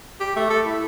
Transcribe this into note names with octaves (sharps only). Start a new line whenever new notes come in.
G4
A3
A4
E4